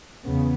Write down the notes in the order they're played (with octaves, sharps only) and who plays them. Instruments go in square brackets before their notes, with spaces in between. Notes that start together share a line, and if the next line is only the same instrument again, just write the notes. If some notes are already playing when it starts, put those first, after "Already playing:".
[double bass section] E2 C#3 B3